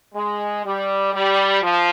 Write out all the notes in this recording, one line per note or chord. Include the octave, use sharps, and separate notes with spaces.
G#3
G3
G3
F3